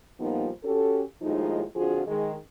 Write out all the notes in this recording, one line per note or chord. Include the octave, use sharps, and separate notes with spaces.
A#2 F3 G3 A#3 B3 D#4
C#4 F#4 G4 A4
D#2 A2 F3 G#3 D#4
F2 D3 F3 F4 F#4 G#4
D#3 G#3